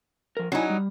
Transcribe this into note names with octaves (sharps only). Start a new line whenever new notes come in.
F3 A#4
F#3 C#4 D#4 E4 G#5
G3